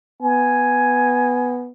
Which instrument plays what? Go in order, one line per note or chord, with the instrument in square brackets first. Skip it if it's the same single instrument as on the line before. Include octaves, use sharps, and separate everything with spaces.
[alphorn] B3 [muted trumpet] G#5